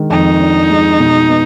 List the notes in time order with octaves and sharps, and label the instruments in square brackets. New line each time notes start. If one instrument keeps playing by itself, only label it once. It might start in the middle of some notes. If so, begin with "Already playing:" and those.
Already playing: [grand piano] D#3 G#3 D4
[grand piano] F2 [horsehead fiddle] D#4
[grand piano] D4
G#3
B2
B3